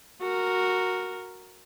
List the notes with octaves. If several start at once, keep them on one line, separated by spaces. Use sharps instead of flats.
F#4 A#4